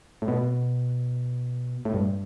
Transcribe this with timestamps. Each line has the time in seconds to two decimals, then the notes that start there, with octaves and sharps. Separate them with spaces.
0.22 A2
0.28 B2
1.85 A2
1.94 G2